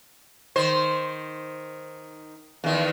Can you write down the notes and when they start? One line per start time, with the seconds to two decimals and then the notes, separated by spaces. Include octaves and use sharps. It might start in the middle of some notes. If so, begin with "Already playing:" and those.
0.56 D#3 C5
2.64 E2 D#3